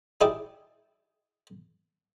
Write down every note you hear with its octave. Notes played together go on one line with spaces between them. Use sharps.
D#4 E4 G4 G#4 D5